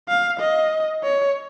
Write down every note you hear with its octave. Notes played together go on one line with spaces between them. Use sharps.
F5
D#5
C#5